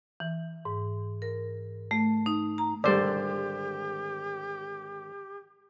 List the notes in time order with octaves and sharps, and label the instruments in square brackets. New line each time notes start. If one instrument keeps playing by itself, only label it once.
[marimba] E3
G#2
A#4
A3
D#4
A#5
[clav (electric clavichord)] G#1 D3 C5 [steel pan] G3 D5 [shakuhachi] G4